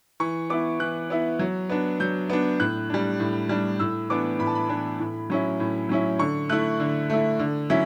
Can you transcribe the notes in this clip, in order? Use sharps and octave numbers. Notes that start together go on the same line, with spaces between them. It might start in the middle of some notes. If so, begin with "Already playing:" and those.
E3 C#6
B3 E4 D6
E3 F#6
B3 E4
F#3
B3 D4
F#3 G6
B3 D4
A2 F#6
G3 D4
A2
G3 D4
A2 E6
E3 B3 D4 D6
A2 B5
A5
B5
E3 B3 D4
A2
F#3 C#4 E4
A2
F#3 C#4 E4
D3 C#6
A3 E4 F#6
D3
A3 E4
D3
F#3 C#4 E4